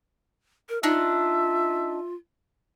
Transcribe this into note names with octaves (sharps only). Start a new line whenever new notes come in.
A#4
D4 D#4 F4 E5